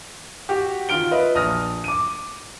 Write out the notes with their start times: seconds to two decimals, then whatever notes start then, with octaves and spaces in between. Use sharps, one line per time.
0.49 F#4 G4
0.89 D#3 F4 F6 D7 G7
1.11 F4 B4 D#5 E5
1.35 A#1 D#6 F6 A#6
1.84 D6 D#7